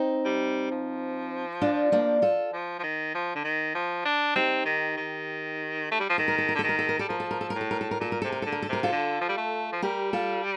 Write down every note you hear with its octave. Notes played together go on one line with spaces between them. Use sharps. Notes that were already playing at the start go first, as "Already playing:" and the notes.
Already playing: C4 D#4
G3
F3
D4 F4
A#3 D4
F4 A4
F3
F3
D#3
F3
D3
D#3
F3
D4
C4 D#4 G4
D#3
D#3
A3
G3
F3
D#3 A4
A#4
A4
A#4
D3
A4
D#3
A#4
A4
A#4
G3 A4
F3 A#4
A4
A#4
A4
A2 A#4
A4
A#4
A4
A#4
A#2 A4
A#4
C3 A4
A#4
D3 A4
A#4
A4
C3 A#4
F4 A4
D3
F3
G3
A3
F3
G3 G4 A#4
F4 A4